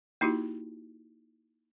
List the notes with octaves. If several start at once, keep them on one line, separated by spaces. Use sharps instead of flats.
A#3 D#4 E4 F#4 G4